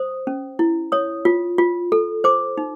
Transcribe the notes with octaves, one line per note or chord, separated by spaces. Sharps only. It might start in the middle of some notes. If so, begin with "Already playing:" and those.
Already playing: C5 D#6
C#4
E4
C#5 D#6
F4
F4
A4
C5 D6
D#4